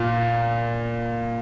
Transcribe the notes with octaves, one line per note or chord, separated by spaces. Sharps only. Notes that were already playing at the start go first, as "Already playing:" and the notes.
Already playing: A#2